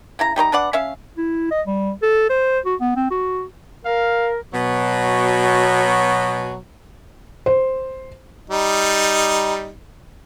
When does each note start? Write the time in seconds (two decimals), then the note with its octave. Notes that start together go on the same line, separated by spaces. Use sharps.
0.19 C#3 E4 A#5
0.36 G3 D#4 C5 A#5
0.52 D4 B4 D5 F#5
0.73 C#4 E5 F5
1.17 E4
1.51 D#5
1.67 G3
2.02 A4
2.30 C5
2.65 F#4
2.81 B3
2.96 C4
3.11 F#4
3.85 A#4 F5
4.53 B2 F#3
7.46 C5
8.50 G3 D#4